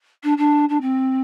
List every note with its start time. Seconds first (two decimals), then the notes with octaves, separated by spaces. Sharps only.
0.23 D4
0.37 D4
0.69 D4
0.81 C4